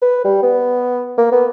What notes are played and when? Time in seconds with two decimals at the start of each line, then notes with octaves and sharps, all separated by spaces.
0.02 B4
0.24 G3
0.43 B3
1.18 A#3
1.32 B3